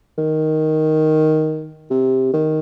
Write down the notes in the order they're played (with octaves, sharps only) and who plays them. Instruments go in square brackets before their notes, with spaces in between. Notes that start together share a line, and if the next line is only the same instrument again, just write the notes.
[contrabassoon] D#3
C3
D#3